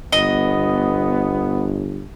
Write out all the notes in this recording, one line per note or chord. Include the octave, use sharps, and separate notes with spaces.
G1 B3 D#5